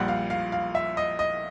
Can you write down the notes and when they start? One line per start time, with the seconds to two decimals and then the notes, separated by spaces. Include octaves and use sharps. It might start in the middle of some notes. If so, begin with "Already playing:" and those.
Already playing: A#1 A#2 G3 F#5
0.08 F5
0.30 F5
0.52 F5
0.75 E5
0.97 D#5
1.19 D#5